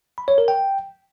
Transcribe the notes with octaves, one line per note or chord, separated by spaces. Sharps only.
B5
C#5
A#4
G5